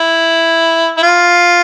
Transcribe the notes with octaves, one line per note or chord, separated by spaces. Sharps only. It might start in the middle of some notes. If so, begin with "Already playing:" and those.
Already playing: E4
E4
F4